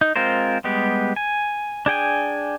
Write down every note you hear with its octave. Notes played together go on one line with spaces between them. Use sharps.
D#4
G#3 C4 F4 A#4 C5
G3 G#3 B3 G4
G#5
D4 G#4 G5 G#5